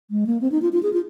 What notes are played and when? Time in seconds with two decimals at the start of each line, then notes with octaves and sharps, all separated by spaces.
0.11 G#3
0.27 A#3
0.41 C4
0.52 D#4
0.62 F4
0.73 F4
0.83 G#4
0.93 F4